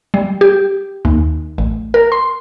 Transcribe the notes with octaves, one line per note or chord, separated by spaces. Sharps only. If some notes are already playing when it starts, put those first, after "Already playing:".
G3
G4
D#2
A1
A#4
C6